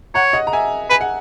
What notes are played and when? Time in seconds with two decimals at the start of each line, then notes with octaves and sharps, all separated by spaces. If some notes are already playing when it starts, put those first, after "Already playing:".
0.14 C#5 F#5 A#5
0.33 D#5 F#5
0.47 A#5
0.53 E5 G#5
0.90 B4 G#5
1.01 F#5